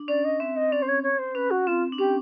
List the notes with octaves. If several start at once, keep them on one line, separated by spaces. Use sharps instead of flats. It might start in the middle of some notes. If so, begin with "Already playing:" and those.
Already playing: D4
C#4 D5
D#5
C4 E5
D#5
C#4 D5
C5
C#5
C#5
C5
C#4 B4
F#4
C4 F4
D4
C#4 G4